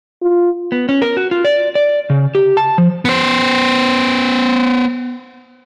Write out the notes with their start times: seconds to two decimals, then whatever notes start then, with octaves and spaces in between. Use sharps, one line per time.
0.22 F4
0.72 B3
0.89 C#4
1.02 A#4
1.17 F#4
1.31 F4
1.45 D5
1.75 D5
2.10 C#3
2.35 G4
2.57 A5
2.78 F3
3.05 B3 C5